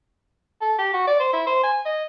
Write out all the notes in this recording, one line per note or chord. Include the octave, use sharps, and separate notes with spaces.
A4
G4
F#4
D5
C5
E4
C5
G#5
D#5